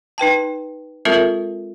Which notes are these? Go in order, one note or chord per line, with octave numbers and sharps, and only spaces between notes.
D#4 B4 G5 A5
G#3 C4 F4 A4 A#4 E5